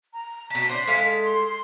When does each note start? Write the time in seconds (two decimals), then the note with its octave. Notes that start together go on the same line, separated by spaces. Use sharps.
0.14 A#5
0.50 B2 A5 B6
0.69 D4 C5
0.87 G#3 A4 F5
1.24 C6